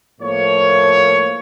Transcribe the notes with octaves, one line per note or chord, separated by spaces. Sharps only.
A2 F3 A#3 C#5